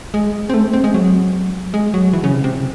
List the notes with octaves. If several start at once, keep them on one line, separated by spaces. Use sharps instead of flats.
G#3
C4
A3
C4
G#3
F#3
G#3
F#3
E3
C#3
C3
C3